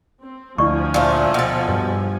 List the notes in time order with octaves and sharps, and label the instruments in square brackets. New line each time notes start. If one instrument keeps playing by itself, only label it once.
[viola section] C4
[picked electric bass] D2 [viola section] F3 G#5 [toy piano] E4 D5 C#6
[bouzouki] A#2 A3
B2 A4
[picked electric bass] G2 G3